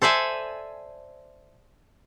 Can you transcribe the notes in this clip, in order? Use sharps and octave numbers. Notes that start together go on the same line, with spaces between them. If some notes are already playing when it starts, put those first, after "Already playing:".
A4 C5 D5 E5 G#5